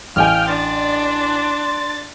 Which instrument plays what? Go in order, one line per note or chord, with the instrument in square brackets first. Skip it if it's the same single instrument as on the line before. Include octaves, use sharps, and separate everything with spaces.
[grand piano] A1 G#5 [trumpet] F5 [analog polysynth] G5 F6
[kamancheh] D4 D5 [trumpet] C6 [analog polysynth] A6